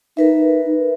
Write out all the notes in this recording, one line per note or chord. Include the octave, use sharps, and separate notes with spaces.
D#4 A#4 B4 E5